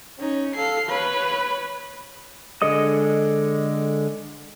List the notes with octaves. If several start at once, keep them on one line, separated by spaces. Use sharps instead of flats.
C#4 D#4
A4 F5 C7
B4 C#5 B5
D3 G#3 A4 D#5 D#6